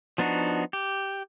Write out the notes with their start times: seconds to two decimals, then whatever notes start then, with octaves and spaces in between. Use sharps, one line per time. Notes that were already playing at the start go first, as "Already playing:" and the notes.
0.18 F3 B3 D4 D#4 F#4
0.73 G4